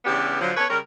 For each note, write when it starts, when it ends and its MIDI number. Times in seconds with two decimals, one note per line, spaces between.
0.05 0.37 49
0.05 0.37 52
0.05 0.37 55
0.05 0.37 59
0.05 0.37 62
0.05 0.37 67
0.41 0.52 50
0.41 0.52 53
0.41 0.52 54
0.57 0.65 59
0.57 0.65 69
0.57 0.65 71
0.57 0.65 73
0.69 0.78 49
0.69 0.78 55
0.69 0.78 61
0.69 0.78 70